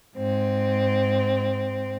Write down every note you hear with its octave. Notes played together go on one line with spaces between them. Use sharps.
G#2 C4